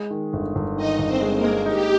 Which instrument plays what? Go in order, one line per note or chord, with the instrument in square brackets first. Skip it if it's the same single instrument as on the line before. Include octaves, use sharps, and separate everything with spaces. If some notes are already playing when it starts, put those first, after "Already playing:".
Already playing: [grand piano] G#3
D#3
G1
G1
[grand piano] D#3 [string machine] D#4 D#5
[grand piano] G1
[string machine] C4 C5
[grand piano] G#3
[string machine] A#3 A#4
[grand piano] G#3
[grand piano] D#4 [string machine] G4